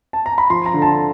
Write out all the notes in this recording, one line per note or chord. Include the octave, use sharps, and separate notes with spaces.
A5
A#5
B5
F3 C6
A#5
D3
A5